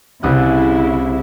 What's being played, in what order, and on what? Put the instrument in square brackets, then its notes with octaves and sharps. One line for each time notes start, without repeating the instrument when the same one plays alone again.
[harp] C2 D#6 F#6 [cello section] C#3 E4